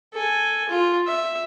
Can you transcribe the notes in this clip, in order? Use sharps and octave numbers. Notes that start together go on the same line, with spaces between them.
A4 G#5
F4
E5